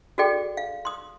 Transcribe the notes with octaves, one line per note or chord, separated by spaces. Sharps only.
F#4 G#4 A4 D5 G5
F5
C6 D#6